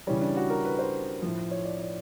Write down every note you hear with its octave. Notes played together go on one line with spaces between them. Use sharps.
C#3 E3 G3 C#4
D4
F#4
A#4
B4
C5
A2 F3
C#5
D5
D5